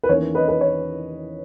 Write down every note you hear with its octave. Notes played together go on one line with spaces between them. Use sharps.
B4
E2 D#3 A#3 C#4 E4 C#5
B4 D#5
B4
C#5